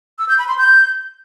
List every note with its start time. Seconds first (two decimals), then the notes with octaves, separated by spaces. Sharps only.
0.19 E6
0.29 G6
0.38 B5
0.48 C6
0.58 G6